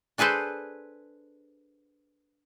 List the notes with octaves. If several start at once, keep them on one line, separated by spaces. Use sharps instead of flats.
D4 G#4 A4 B4 C5